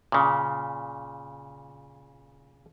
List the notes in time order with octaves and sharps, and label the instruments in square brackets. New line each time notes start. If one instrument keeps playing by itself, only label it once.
[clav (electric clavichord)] A#2 C#3